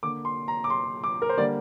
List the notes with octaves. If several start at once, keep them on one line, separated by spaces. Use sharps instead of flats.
D3 A#3 D6
C6
A#5
D6
C6
D6
A#4
C5
D3 G3 A#3 D5